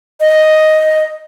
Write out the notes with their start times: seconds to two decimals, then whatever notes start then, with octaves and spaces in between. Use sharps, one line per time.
0.20 D#5